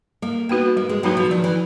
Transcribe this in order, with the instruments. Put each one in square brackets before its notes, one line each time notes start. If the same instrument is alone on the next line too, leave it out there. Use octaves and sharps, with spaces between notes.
[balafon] G3 [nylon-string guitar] A#3
[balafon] A#3 D#4 F#4 B4 [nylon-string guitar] B3
[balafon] G3 [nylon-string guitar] A#3
[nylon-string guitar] G#3
[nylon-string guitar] F#3 [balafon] A#3 D#4 F#4 B4
[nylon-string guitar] F3
[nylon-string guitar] D#3 [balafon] F3
[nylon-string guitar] E3